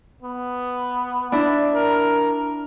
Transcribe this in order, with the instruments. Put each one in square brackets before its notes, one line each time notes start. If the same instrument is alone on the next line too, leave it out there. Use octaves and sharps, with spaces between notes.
[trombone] B3
[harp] D4 E4
[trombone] A#4